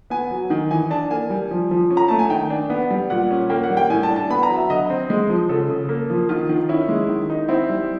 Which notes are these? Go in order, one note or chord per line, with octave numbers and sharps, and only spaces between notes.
B3 G#5
F#3
D#3
E3 G#5
D4 A5
A#3 G#5
G3
F3
F3
C#4
A#5
A3 A5
G#5
D#3 G5
D4
B3
G3
A#2 F#5
C#4
A#3 G5
F#5
G3
G5
A2 G#5
A5
D4
A5
B3 B5
A#5
F#3
E5
D3 D#5
C4
G#3
F3
C#3 A4
C#3
A#3
F3
D#3 F4
D#3
C#4 E4
G#3
D#3
D#4
C4 E4
G3